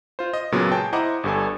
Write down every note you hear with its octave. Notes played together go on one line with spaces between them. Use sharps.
F4 C5
D#5
C#2 A#2 C#3 F#3 B3
G#4 C#5 G5 A5
E4 C5 D#5 F#5 A#5 D6
G1 G2 A4 G#5